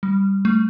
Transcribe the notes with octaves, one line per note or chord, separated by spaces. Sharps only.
G3
A3